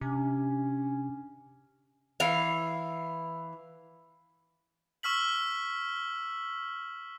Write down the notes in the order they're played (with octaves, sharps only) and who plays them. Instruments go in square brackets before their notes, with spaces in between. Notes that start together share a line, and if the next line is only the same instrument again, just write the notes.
[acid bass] C3 [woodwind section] C#4 [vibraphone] D4 G#5
[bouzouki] E3 F5
[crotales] C#6 E6 F6 B6 F#7